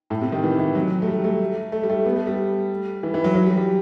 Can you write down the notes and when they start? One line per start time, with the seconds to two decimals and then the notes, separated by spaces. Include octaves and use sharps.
0.10 A2
0.22 C3
0.32 D#3
0.43 E3
0.60 E3
0.75 F#3
1.02 A3
1.07 G3
1.24 A3
1.72 A3
1.83 G3
1.90 A3
2.05 B3
2.16 A3
2.27 G3
3.03 E3
3.14 E3
3.24 F#3
3.35 F#3
3.46 G3
3.57 G3